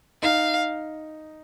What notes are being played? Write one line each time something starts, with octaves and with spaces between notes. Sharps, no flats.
D#4 F5